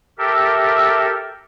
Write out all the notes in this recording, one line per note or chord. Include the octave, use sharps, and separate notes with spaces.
G4 A4 A#4 E5